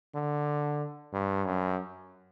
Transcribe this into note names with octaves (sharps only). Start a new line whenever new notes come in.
D3
G2
F#2